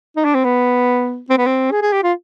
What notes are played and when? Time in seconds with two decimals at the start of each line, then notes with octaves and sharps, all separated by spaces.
0.16 D#4
0.25 D4
0.35 C4
0.44 B3
1.30 C4
1.38 B3
1.46 C4
1.72 G#4
1.82 G#4
1.93 G4
2.03 F4